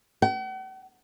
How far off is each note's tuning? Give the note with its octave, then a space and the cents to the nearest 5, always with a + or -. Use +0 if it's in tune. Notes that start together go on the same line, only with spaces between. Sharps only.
F#5 +45